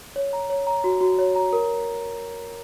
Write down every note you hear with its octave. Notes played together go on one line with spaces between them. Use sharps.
C#5
A#5
C#5
A#5
F#4
F#4
C#5
A#5
A#4